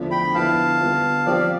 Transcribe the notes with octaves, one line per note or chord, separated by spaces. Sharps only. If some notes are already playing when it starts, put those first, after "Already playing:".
Already playing: E2 D3 F3 A3 D4
G5 B5
D3 F3 B3 E4 F5 A5
D3 G3 B3 F4
F3 C4 G4 D5 F5